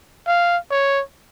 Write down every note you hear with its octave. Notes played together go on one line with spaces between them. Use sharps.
F5
C#5